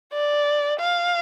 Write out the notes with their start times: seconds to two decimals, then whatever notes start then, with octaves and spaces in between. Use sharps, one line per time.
0.13 D5
0.80 F5